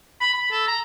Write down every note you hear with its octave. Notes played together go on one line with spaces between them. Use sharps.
B5
B5
A4
A#5